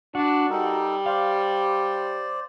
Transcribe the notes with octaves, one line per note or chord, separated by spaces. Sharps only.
D4 F#4
G3 D#4 A4 A#4
C5 D5 F5